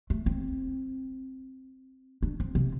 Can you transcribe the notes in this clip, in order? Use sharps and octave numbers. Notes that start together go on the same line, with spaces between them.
A3
C4
D4
C4
C3